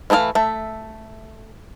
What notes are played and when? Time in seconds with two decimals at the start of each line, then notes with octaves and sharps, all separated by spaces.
0.10 E3 A3 E4 G#4 F5
0.35 A3 E5